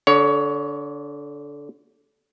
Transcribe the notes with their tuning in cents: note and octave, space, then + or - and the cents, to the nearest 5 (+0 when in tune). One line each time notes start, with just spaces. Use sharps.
D3 -15 C#5 +20